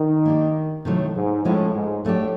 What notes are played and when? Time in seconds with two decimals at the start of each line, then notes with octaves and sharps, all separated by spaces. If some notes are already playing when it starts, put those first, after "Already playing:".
Already playing: D#3
0.26 A#3 D4 G4
0.85 A2 C3 D#3 F#3 A3
1.15 G#2
1.45 A2 F3 G#3 C#4 F4
1.74 G#2
2.04 A2 F#3 A3 D4 G4